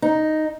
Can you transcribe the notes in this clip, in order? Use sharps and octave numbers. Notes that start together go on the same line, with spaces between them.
D#4